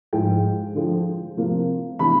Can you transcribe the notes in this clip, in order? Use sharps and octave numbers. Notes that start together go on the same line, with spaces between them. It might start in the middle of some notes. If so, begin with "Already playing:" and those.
G#2 F3 G#3 G5
D3 F3 G#3
C3 F3 A#3
C3 E3 G#3 B3 D4 B5